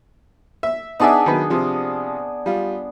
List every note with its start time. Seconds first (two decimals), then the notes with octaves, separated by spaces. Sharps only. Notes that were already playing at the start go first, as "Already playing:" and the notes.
0.63 E5
1.00 B3 D4 D#4 G#4 D5 E5
1.26 D#3 F#3 B4
1.50 C3 F3
2.46 G3 F4